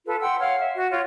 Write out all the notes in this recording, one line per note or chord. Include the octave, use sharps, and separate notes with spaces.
F4 A4 B4
F#5 G5 C6 E6
C#5 F5 F#5 F6
E5
F#4
F4 C#5